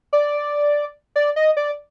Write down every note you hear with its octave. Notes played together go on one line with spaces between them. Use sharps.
D5
D5
D#5
D5